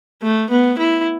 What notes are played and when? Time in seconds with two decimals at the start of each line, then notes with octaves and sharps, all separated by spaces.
0.23 A3
0.50 B3
0.78 E4